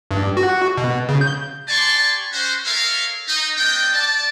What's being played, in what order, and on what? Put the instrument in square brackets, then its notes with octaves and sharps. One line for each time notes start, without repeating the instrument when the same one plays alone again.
[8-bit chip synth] G2
F#4
B2
C#3
G6
[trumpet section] G4 D5 G#5 A5 C6 C#6
C#4 F#4 C5
A4 A#4 C#5 E5 F5
D#4
A3 C4 D4 D#5 G5
D5 A5